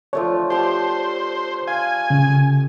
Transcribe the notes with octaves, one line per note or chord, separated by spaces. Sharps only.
F3 A3 D4 C#5
G4 C5 A5
F5 G#5
C#3